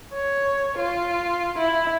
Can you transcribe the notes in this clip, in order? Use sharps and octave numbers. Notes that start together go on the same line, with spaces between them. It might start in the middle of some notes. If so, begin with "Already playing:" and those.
C#5
F4
E4